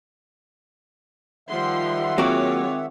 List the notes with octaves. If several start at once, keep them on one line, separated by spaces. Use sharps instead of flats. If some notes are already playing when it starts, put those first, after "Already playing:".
D#3 F3 G3 E5 F#5 C6
F#3 G#3 A#3 C4 F4 F#4 C#5 D6